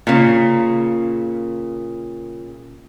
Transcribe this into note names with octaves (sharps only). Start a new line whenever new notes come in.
A#2 C#3